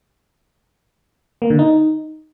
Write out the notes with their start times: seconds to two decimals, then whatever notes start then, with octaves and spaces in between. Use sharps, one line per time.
1.42 A#3
1.50 D3
1.59 D#4